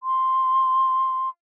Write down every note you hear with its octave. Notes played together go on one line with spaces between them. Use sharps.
C6